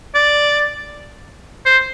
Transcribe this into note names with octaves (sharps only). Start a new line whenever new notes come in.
D5
C5